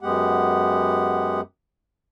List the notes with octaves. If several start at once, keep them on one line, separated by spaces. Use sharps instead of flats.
F#2 G#3 B3 G4 F#5